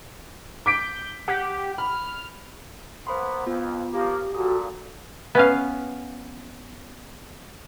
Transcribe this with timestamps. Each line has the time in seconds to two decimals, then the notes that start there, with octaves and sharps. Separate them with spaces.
0.66 D6 G6 B6 D7
1.28 G4 F#5
1.78 B5 F6
3.07 A#3 B3 C5 B5 C6
3.46 F2 B3 F4
3.92 F3 A#3 G4
4.35 A#2 F#4 A4 D#6
5.35 B3 C#4 F5